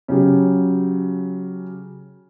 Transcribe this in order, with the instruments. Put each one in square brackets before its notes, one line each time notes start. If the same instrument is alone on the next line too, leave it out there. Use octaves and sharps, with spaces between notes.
[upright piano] C#3 F#3 G4